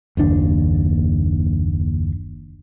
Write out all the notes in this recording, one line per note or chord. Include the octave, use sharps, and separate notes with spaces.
F#1 D#2 D4